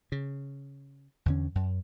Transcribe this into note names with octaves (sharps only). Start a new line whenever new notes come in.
C#3
E2 D3 C#4
F#2